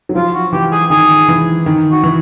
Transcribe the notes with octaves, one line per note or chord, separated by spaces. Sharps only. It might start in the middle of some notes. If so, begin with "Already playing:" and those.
F#3
F3 F4
F#4
E3 G4
G#4
D#3 G#4
E3
D#3
F#4
E3